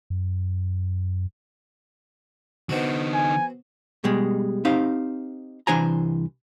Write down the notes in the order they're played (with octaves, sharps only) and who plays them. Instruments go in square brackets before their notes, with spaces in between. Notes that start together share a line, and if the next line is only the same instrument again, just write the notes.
[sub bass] F#2
[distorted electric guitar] D3 D#4 [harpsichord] B3 C4 F#4
[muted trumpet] G#5
[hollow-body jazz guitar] B2 G3 G#3
C4 D#4 G4 C5 F5
C2 E3 D4 C5 G#5 A#5